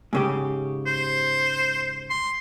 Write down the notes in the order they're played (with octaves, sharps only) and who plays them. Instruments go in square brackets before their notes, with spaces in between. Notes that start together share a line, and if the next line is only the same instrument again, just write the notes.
[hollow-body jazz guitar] G#2 C#3 G4
[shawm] C5
C6